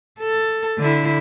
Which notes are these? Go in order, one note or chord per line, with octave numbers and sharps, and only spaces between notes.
A4
D3 E4